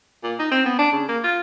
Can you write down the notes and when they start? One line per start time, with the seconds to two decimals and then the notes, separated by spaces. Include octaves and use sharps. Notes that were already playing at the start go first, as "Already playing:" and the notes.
0.23 A#2
0.39 D#4
0.52 C4
0.66 B3
0.79 D4
0.92 C#3
1.09 A#3
1.24 F4